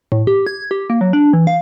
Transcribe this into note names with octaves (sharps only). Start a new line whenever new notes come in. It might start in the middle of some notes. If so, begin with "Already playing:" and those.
A2
G4
G#6
G4
A#3
F#3
D4
E3
F5